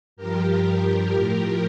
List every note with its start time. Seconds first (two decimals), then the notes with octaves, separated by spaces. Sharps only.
0.17 G2 F3 G4 A#4
1.12 A2 F3